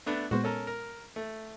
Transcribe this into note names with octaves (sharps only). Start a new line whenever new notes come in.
A3 B3 D4
A#2 G#3 B3 F#4 C5
C#4 A4 A#4
A#4
A3